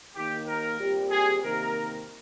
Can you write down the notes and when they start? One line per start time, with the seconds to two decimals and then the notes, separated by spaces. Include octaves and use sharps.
0.15 D#2 D#3 A#3 G4
0.47 A#4
0.78 A#2 G3 C4 G4
1.11 G#4
1.43 C3 D#3 A#3 A#4